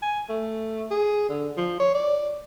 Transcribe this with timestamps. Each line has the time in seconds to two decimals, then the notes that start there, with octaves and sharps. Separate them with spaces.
0.02 G#5
0.29 A3
0.91 G#4
1.29 D3
1.57 F3
1.80 C#5
1.95 D5